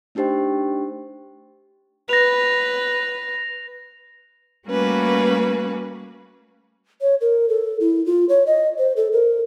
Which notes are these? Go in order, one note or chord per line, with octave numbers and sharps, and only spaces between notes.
A3 D4 D#4 G4 C5 G5
B4 A#6 F7
G3 A3 A#3 C#4 F#4 B4
C#5
A#4
A4
E4
F4
C#5
D#5
C5
A4
A#4